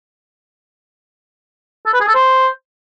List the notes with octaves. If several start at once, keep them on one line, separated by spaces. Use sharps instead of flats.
A4
B4
G#4
A4
C5